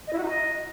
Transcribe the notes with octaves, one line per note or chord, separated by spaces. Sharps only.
D#5
E4
F#4
D#4
D#5